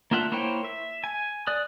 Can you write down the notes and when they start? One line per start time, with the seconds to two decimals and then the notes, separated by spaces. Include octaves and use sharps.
0.11 A#3 D4 F4 E5 F#5
0.32 A#3 E4 C5 C#5 G5
0.64 E5
1.04 G#5
1.47 D5 D#6 F#6